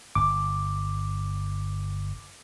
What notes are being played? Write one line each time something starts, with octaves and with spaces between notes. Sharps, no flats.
G1 D6